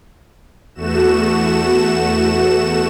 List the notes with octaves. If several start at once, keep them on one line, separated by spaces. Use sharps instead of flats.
E2 A3 F#4 E7